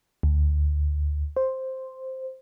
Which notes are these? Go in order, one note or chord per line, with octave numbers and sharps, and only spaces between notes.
D2
C5